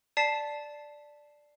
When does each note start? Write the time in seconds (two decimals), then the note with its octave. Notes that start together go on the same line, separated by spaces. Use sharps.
0.17 D5 A5 B6 C7 E7